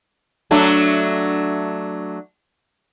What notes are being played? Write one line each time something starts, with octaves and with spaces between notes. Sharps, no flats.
F#3 A3 D4